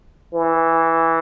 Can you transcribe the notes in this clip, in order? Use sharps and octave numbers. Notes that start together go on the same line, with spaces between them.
E3